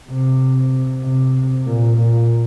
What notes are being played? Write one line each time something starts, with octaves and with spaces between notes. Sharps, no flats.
C3
C3
A#2
A#2